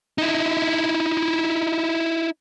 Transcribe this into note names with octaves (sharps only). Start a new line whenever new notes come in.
D#4 E4